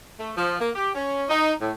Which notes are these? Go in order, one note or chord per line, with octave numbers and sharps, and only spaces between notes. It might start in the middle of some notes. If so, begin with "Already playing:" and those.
A3
F3
A#3
G4
C#4
D#4
A2